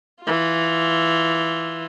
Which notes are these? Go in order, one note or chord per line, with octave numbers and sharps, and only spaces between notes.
E3 F4